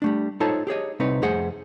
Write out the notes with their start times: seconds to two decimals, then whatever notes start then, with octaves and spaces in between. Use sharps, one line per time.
0.02 G3 A3 D4
0.40 D#4 F4 A4 C5 C#5 A5
0.67 G4 G#4 C#5 D#5
1.00 C2 C4 D#4 B4 C#5
1.22 F2 A3 G#4 C5 F#5